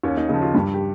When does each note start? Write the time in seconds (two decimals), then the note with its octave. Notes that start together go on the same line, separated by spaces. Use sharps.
0.03 D#2 C#4
0.17 D#4
0.29 C#3 F3 D#4
0.42 F4
0.54 G2 G4
0.74 G4